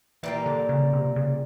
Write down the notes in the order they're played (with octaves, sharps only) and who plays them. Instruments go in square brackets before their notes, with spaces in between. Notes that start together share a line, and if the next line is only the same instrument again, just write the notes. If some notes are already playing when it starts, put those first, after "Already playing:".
[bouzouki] A#2 G3 A#3 [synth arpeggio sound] E3
[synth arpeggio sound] D3
C#3
C3
C#3